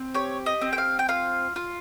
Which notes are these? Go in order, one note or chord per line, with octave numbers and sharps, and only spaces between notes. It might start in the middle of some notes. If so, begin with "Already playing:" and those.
Already playing: C4
G4 C#5
D#5
C4
G5
F5
G5
F4 F5
F4